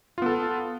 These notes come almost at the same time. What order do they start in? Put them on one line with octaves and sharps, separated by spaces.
F4 B3 A4